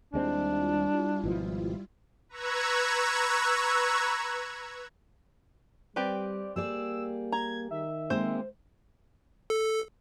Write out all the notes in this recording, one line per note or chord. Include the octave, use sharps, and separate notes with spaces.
D#2 G3 G#3 C4 D4 E4 F4
G#1 B2 F3
B4 A#5 C#6 E6 F#6 G#6
G3 C4 G4 B4 D5
G3 A#3 G#4 D5 E6
A#5 G#6
D#3 E5
G#3 A#3 C4 C5
A4